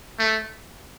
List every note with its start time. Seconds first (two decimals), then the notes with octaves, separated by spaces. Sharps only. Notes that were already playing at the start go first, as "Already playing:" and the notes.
0.19 A3